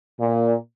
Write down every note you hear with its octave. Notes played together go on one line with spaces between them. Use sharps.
A#2